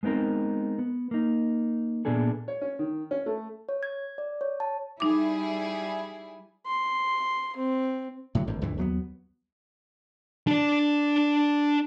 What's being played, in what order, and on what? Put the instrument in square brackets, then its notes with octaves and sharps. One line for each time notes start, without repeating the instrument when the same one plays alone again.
[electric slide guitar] G#3 B3 C4 D#4 A#4
B3
A#3 D#4
A#2 B3 D4 G#4 A4
[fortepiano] C#5
C#4
D#3
C#4
A3
[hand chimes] C#5
G#6
D5
C#5
A5
[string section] G3 E4 G#4 [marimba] D#4 D6
[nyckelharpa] C6
C4
[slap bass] A2 D3 F#3
G#1 G2 D3
C#2 G2 A#2 E3
D#2 F#3 A#3 B3
[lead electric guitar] D4 D5